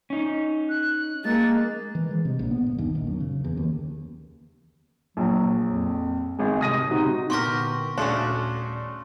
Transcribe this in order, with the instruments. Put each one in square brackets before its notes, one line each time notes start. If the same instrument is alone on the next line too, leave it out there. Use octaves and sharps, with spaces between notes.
[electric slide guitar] C#4 D#4
[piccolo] F#6
[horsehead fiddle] G#3 A#3 [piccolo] A6
[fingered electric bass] E3
G#3
C3
A#1
B3
G1
D#2
A#1
F#2
C#3
E2
D#2
[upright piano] A#1 [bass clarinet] F#3
[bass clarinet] F2
[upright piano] G#1 G#4 [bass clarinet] G#3
[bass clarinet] C3 [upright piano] D#6 A#6 D#7
[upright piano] C3 F#4 [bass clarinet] D#4
[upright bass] A#2 D3 [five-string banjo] B3 G4 A#4 [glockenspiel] C6 C#6 A#6
[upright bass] D#1 [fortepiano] C#3 A3 F#4 [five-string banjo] C#4 D4 [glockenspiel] C6